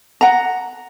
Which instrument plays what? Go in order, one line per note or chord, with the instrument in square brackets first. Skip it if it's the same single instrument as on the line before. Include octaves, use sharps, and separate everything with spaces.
[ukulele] F#5 A#5